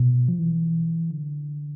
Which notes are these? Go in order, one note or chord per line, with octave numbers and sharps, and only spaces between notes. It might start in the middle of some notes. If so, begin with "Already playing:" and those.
Already playing: B2
F3
E3
D3